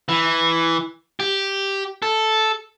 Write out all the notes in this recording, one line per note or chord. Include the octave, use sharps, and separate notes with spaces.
E3
G4
A4